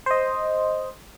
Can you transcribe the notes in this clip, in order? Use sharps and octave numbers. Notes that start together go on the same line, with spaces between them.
C5 D#5